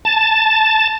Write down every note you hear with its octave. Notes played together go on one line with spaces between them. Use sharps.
A5